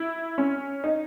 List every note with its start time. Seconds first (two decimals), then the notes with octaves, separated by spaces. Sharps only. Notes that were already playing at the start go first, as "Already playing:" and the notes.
Already playing: E4
0.38 C#4
0.84 D#4